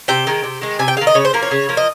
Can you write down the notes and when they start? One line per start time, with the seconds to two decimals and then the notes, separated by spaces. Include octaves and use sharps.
0.08 C3 G5
0.27 D#3 G#3
0.44 C3
0.61 D#3 G#3
0.79 C3 G#5
0.88 G5
0.97 G#3 F5
1.01 D#3
1.07 D#5
1.14 C#3 C#5
1.25 C5
1.33 F3 A#3 A#4
1.42 C#5
1.51 C#3
1.69 F3 A#3
1.77 D#5